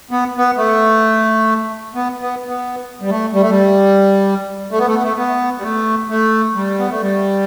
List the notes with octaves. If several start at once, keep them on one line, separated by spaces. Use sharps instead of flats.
B3
B3
A3
B3
B3
B3
G3
A3
G3
A3
G3
A3
B3
A3
B3
A3
B3
G3
A3
A3
G3
B3
A3
G3